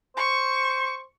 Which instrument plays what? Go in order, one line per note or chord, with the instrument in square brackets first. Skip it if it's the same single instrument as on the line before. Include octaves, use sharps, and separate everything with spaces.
[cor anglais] C5 [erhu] C#6